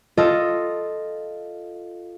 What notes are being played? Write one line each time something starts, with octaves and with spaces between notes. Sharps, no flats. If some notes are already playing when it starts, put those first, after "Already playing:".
F4 A4 D#5